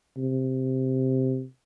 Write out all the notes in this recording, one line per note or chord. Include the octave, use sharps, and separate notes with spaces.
C3